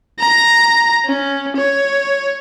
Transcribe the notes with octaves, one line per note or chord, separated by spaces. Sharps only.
A#5
C#4
C#5